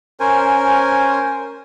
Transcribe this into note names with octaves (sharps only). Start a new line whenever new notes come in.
C#4 A#4 C5 G#5